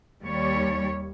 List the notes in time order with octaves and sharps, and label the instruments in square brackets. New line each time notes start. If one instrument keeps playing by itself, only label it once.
[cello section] D#2 G3 C#5